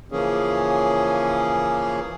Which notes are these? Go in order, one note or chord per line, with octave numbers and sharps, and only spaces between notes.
C#3 E3 F3 A#3 C#4 G#4